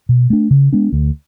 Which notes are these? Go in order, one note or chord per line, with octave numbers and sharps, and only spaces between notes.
B2
A3 D4
C#3
G#3 B3 D4
D2